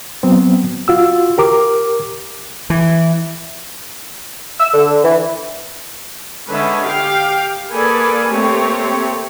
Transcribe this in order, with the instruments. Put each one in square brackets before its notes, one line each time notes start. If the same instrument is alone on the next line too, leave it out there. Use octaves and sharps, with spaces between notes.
[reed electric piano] F#3 B3 C4
F4 F#4 E6
G4 A#4 D6
[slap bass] E3
[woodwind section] E6
D3
E3
[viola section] D3 G#3 C#4 B4 E5
G4 F5 G5
A#3 G#4 A4 B4 D5 G#5
A3 A#3 C4 G4 C#5